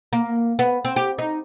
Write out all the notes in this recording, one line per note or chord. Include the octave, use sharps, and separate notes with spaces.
A#3
B3
C4
G4
D#4